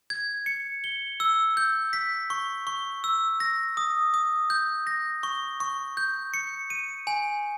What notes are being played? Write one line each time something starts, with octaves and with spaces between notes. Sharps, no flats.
G#6
C#7
G7
E6
G6
B6
C#6
C#6
E6
A#6
D#6
D#6
G6
A#6
C#6
C#6
G6
C#7
D#7
G#5